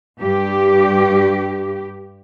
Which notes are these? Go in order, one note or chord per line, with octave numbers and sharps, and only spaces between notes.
G2 G4